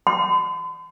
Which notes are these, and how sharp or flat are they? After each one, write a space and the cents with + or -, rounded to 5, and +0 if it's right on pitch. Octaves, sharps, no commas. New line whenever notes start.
C6 -45